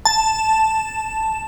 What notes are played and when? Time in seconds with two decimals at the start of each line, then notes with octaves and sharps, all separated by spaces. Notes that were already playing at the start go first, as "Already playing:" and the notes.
0.05 A5